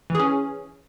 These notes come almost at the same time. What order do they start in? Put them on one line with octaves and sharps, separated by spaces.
E3 G#4 C#4